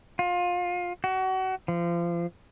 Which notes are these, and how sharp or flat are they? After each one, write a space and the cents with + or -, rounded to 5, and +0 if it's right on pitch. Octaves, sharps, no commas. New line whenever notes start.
F4 +25
F#4 +30
F3 -30